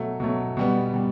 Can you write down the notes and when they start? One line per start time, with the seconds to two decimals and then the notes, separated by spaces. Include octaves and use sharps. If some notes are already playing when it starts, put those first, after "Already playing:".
Already playing: B2 F#3 A3
0.20 B2 F#3 A3
0.57 B2 G3 B3
0.94 B2 G3